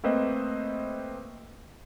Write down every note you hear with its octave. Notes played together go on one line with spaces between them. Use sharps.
A3 A#3 C4 B4 C5 D#5